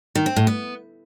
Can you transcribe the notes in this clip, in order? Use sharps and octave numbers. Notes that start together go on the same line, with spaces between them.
D#3
C4
A2
B3